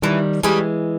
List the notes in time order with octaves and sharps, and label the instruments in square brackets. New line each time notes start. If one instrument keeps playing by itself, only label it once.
[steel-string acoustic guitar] D#3 G3 [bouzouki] E3
[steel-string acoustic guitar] E3 G#3 [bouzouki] G3 C#4 G#4